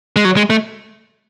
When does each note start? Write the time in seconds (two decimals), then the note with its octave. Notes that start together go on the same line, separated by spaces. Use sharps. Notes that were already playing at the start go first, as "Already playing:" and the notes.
0.16 G#3
0.25 F#3
0.37 G#3
0.50 A3